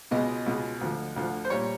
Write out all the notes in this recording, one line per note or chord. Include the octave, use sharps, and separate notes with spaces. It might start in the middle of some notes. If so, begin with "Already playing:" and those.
C#2 B2 G#3 B3 D#5
C#2 B2 G#3 B3
D2 D3 F3
D2 D3 F3
C5
A#2 G3 C#5